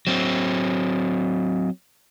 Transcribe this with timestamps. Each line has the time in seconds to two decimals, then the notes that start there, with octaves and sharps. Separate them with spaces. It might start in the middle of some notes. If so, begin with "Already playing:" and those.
0.07 F#3 C4